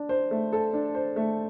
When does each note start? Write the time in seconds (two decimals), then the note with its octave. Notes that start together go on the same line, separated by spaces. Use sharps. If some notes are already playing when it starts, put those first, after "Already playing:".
Already playing: D4
0.09 C5
0.31 A3
0.53 A4
0.73 D4
0.95 C5
1.16 A3